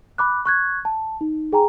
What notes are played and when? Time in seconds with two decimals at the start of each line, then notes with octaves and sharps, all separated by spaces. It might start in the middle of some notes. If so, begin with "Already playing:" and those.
0.18 B5 D6 F#6
0.45 C#6 F#6 G#6
0.85 A5
1.21 D#4
1.53 G#4 G5 G#5 A#5